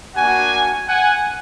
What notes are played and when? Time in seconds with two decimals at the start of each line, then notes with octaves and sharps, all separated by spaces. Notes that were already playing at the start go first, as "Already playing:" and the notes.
0.15 A#3 D4 F#4 F#5 G#5
0.87 F#5 G#5